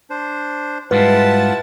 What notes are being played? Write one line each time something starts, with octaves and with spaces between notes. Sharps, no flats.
D4 C5
G#2 G3 G#3 E4 F4 B4 F#5 A5